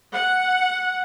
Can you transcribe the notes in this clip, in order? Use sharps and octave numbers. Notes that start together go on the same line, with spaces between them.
F#5